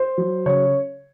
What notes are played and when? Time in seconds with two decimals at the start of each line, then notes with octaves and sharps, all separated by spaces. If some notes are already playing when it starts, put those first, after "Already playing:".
Already playing: C5
0.17 F#3
0.46 C#3 C#5